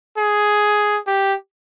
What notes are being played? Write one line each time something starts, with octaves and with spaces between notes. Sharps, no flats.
G#4
G4